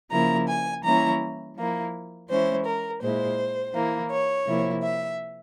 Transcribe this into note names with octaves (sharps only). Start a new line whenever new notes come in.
C#3 F3 A#3 E4 A#5
G#5
E3 G3 A#3 C#4 E4 A#5
F3 A#3 E4
E3 G#3 C#4 E4 C5
A#4
A#2 G#3 E4 C5
E3 A#3 E4
C#5
C3 F3 A#3 E4
E5